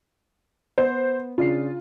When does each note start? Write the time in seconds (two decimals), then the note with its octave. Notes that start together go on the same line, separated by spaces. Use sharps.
0.78 B3 C5
1.38 C#3 D4 F4 C7